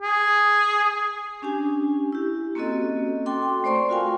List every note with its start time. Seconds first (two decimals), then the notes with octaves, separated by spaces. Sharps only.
0.01 G#4
1.42 C#4 D4 G4 G#5
2.12 E4 G4
2.55 A#3 C4 C#4 F#4 A4 D#5
3.26 F#4 A4 G5 C6 D6
3.64 A3 C5 D5 C6 C#6
3.89 F4 F#4 A#4 F5 G5 G#5